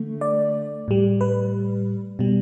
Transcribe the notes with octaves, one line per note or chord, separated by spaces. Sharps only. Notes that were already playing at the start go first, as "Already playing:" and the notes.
Already playing: D3 A3
D5
A2 G3
B4
B2 G3